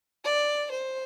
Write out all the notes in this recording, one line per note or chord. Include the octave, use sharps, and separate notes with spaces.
D5
C5